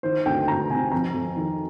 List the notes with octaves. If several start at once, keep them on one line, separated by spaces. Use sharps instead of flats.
D#3 C5
D2 G5
D2 A#5
C3 G#5
F2 A#5
F2
D#3